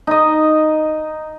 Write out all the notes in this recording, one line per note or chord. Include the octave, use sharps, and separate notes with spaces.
D#4 D#5